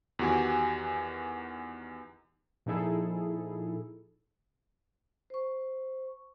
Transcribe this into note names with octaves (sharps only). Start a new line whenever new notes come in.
E2 D#3 F#4 G4 G#5
A#2 F3 D#4 E4 G#4 A4
C5 C#6